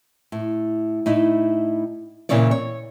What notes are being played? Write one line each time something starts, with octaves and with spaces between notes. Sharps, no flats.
A2
A2 D#4 E4
A#2 C#3 E3 C4 C#5 D5
C#5